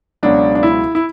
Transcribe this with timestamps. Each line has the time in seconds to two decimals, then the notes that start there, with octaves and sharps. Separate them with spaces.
0.23 C#2 B2 F#3 D4
0.55 D4
0.63 E4
0.95 E4